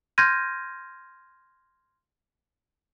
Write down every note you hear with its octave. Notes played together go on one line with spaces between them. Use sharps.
C6 F6 G6 G#6 A#6 D#7